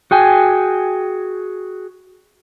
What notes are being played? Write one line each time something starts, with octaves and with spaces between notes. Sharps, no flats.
F#4 G#4 G5 G#5